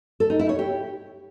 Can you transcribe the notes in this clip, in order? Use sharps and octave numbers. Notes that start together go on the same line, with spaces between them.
A4
D#4
E4
C#5
G4